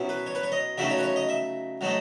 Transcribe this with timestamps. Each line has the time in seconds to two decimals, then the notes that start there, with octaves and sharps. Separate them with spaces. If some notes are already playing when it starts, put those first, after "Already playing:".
Already playing: B2 F#3 C#4 E4
0.09 B4
0.26 C#5
0.35 B4
0.43 C#5
0.52 D#5
0.78 C#3 F#3 A3 D#4 E5
0.90 C#5
0.98 B4
1.03 C#5
1.16 D#5
1.29 E5
1.81 F#3 A3 D#4